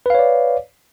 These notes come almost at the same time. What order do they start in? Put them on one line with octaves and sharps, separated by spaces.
B4 F5 C#5 D5